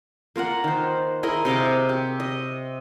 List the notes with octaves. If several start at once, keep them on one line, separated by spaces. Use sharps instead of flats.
A#3 F4 A#4 F#5
D#3 C5
E4 G#4 A#4 D#5
C3 D#5 F5 D6
G4
D#5